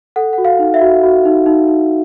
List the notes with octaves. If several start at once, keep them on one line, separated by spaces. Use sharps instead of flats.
A4 F#5
F#4 F#5
F5
D#4
E5
F#4
F#4
D#4
D#4
D#4